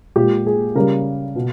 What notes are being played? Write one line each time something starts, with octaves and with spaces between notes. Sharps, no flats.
A#2 G#3 G4
G#4
C#3 G3 A#4
B2